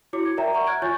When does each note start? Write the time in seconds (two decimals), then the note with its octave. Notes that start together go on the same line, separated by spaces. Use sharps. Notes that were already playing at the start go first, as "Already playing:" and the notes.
0.13 E4 F#4 C#5 D6 C#7
0.25 G#6
0.37 A#4 C#5 D5 E5 G5 A#5
0.53 D5 E5 F#5 A#5 C#6
0.66 F6 F#6 G#6 D7
0.82 F4 C#5 G#5 C#6 G6 A6